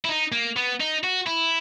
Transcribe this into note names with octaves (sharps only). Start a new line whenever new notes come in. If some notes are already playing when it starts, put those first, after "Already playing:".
E4
D#4
A#3
B3
D#4
F#4
E4